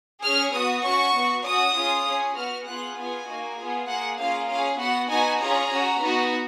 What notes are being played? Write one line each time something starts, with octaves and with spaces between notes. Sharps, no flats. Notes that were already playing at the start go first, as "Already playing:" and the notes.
C#4 G#4 F6
B3 F#4 D#6
C#4 F#4 C#6
B3 F#4
C#4 F#4 D#6
C#4 F4 G#4
C#4 G#4
B3 F#4 F6
B3 F4 G#4 F#6
B3 F4 G#4 G#5
A#3 D#4 F#4
B3 F4 G#4
A#3 F4 G#4 F#5
A#3 C#4 F4 G#4 F5
C#4 G#4 F5
B3 F#4 F#5
B3 D#4 F#4 G#5
C#4 F4 G#4 A#5
C#4 F#4
B3 D#4 F#4